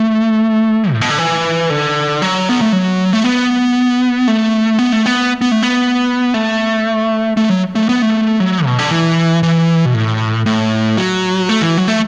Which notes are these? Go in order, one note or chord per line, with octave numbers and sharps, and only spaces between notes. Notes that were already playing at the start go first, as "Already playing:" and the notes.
Already playing: A3
A2
B2
D3
E3
D3
F#3
B3
A3
F#3
A3
B3
A3
B3
A3
B3
B3
A3
B3
A3
A3
F#3
A3
B3
A3
F#3
B2
D3
E3
E3
B2
A2
A2
F#3
A3
E3
F#3
A3